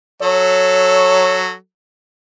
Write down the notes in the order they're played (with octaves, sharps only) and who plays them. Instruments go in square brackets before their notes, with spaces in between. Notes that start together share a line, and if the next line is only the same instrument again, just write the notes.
[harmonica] F#3 A4 [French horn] C#5